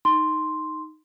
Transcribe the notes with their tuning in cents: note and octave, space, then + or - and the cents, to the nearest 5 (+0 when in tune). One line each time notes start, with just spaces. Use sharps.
D#4 +0 C6 +0